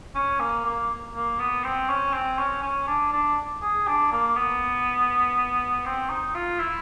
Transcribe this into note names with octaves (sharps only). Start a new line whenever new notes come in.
C#4
A#3
A#3
A#3
B3
C4
C#4
C4
C#4
C#4
D4
D4
G#4
D4
A#3
B3
C4
D#4
F4
E4